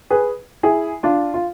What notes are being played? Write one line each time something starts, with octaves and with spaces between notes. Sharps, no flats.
G#4 B4
E4 G#4
D4 F4
F4